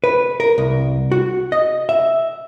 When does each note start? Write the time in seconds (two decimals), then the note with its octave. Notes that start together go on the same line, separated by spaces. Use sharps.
0.04 B4
0.40 A#4
0.58 C2
1.12 F#4
1.52 D#5
1.89 E5